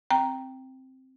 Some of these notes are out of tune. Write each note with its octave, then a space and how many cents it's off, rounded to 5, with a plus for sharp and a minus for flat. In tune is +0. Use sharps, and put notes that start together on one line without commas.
C4 +0 G5 +0 A#5 +0